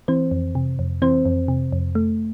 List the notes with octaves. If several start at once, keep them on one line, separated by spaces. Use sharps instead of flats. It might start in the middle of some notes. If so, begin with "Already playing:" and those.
E3 C4 C5
F2
C3
F2
E3 C4 C5
F2
C3
F2
A3